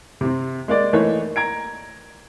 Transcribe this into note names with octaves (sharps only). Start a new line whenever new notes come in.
C3 C4
G#3 A#3 D5
E3 A3 A#3 D#4 C#5
A#5 G#6 D7